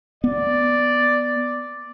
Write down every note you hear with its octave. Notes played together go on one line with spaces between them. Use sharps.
B3 D5